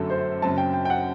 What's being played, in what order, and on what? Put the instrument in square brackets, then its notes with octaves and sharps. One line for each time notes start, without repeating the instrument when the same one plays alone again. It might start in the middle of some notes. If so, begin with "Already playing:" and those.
Already playing: [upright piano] G1 F#2 F#3 A3 [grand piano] A4
[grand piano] C5
[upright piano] F#1 F#2 F#3 C4 [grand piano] A5
[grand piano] G5
G5
G5
F#5